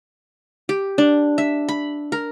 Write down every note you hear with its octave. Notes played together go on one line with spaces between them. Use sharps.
G4
D4
E5
B5
A#4